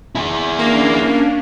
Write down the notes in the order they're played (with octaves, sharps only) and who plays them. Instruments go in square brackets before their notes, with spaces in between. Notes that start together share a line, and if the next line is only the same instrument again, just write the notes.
[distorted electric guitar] E4 G#4
[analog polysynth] A#3 [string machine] C#4 D4